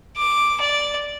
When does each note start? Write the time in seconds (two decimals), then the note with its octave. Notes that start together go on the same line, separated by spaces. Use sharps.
0.17 D6
0.60 D5